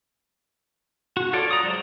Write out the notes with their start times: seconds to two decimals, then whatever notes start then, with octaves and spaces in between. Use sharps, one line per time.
1.17 F#4
1.33 F4 A4 C#5 D5
1.51 D5 A#5 D#6
1.63 F#3 G#3 C5